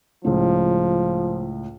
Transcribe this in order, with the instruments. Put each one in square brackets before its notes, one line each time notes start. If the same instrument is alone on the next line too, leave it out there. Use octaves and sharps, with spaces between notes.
[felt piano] C#2 A2 [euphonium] F3